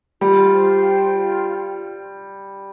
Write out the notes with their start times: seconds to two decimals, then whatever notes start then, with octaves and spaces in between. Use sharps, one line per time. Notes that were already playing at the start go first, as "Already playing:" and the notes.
0.21 G3 F4
0.51 C5
0.81 G5
1.12 F4